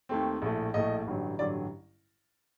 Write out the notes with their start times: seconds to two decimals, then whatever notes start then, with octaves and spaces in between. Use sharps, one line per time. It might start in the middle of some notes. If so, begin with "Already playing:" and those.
0.09 D#2 D#3 A3 C4
0.42 A#1 A2 A3
0.74 A#1 A2 A3 D#5
1.07 A1 G2 D3 F#3
1.38 A1 G2 D3 F#3 D5